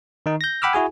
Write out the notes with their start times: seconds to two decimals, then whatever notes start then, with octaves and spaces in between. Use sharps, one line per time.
0.26 D#3 D#4
0.41 G6 A#6
0.62 F#5 G5 B5 D6 E6 F6
0.73 E4 F#4 G#4 G#5